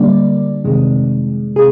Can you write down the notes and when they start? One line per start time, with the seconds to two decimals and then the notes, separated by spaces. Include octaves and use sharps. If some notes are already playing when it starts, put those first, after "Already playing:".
Already playing: D3 G3 A#3 D4 D5
0.64 F2 C3 D#3 G#3
1.56 C3 G#4